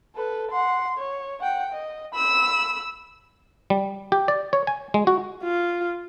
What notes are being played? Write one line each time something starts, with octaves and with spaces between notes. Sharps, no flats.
A4 B4
F#5 C6
C#5
F#5 G5
D#5
B5 E6
G3
G4
D5
C#5
G#5
G#3
F#4
F4